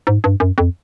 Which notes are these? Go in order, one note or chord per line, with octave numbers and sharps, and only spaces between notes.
G#2
G2
F#2
F2